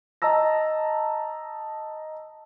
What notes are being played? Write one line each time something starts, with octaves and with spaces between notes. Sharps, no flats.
D#5 A5 A#5 E6 A#6